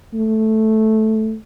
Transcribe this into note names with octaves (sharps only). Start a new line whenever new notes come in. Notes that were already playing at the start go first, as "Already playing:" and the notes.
A3